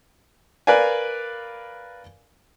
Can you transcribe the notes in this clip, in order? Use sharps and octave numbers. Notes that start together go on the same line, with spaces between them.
A#4 B4 D5 F5 G#5